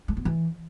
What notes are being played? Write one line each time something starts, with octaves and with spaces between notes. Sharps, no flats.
G#3
B3
E3